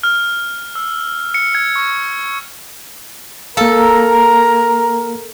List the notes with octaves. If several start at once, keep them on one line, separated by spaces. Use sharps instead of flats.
F6
E6
C#7
G#6
C#6
A#3 A4 A#4 F5 A#5